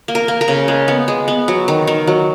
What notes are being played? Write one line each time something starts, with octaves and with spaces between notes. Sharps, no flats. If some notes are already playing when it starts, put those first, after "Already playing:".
A#3
A#4
A#3
A#4
C#3
G#3
B3
G#3
B3
F#3
D#3
D#3
F#3